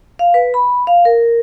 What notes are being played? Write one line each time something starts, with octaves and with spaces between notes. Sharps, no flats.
F5
B4
B5
F5
A#4